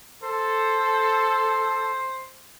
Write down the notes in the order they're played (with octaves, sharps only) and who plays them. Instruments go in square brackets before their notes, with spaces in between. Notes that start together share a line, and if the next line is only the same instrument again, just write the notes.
[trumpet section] A4 [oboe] C5